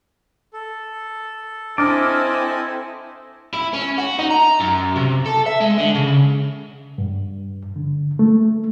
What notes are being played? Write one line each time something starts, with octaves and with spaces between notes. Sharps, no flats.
A4
C4 D4 E4 A4 D#5 G#5 D6 F6
E4
C#4
F#4
D#4
A#5
F#2
C3
A4
E5
G#3
D3
C#3
G2
D3
A3